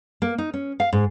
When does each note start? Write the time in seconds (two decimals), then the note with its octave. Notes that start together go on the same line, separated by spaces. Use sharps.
0.22 A#3
0.38 D#4
0.54 C#4
0.80 F5
0.93 G#2